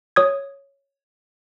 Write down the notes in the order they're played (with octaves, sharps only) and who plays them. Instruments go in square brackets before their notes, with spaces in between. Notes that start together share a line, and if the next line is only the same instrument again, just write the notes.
[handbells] C#5 D#6 G#6